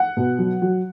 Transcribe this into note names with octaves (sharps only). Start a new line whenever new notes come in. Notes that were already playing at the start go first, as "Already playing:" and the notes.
Already playing: F#5
B2
F#3
F#3